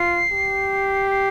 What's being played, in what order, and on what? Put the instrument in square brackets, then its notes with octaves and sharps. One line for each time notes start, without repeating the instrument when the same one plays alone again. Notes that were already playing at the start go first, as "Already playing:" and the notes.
Already playing: [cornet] F4 [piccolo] C7
[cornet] G4
[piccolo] C7